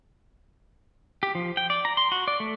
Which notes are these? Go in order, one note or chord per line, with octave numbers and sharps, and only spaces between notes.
G4
F3
G5
D5
A#5
C6
F#4
D5
A3